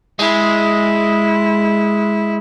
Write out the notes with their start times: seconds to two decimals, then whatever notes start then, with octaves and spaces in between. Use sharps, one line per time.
0.19 G#3 E4